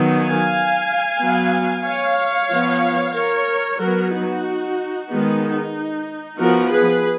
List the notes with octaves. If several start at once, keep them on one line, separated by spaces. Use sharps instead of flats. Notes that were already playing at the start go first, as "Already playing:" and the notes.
Already playing: D#3 F#3 B3
F5 G#5
F#3 B3
C#5 F5
F3 B3
A#4 C#5
F#3 B3 F#4 A#4
D#4 F#4
D#3 G#3 B3 D#4
F3 B3 F#4 A#4
G#4 B4